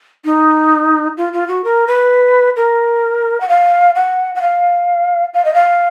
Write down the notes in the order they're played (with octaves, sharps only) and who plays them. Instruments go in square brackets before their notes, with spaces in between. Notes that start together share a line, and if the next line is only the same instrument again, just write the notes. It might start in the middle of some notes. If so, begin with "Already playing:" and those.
[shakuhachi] D#4
F4
F4
F#4
A#4
B4
A#4
F#5
F5
F#5
F#5
F5
F5
D#5
F5